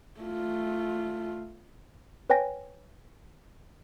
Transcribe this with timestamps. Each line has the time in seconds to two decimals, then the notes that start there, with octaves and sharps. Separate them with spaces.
0.20 A3 F4
2.30 B4 C#5 G5 G#5 A#6